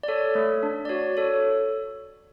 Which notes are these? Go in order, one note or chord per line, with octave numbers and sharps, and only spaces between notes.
D5
A4 C#5
A3
D4
D5
F#4 C#5
A4 C#5